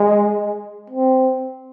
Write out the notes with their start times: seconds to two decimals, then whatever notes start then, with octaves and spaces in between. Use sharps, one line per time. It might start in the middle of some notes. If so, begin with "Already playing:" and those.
Already playing: G#3
0.90 C4